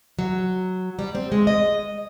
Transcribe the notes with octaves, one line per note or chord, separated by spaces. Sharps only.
F#3
G3
C4
G#3
D#5